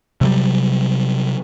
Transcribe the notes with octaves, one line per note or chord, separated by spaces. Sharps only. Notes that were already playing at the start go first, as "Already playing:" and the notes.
C3 F#3 G3